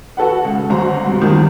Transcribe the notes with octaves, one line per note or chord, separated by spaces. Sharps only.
F#4 A4 B4 F#5
C#2
G1 C4 F#4 A#5 C6
G2 C3
E2 G2 D#3 F3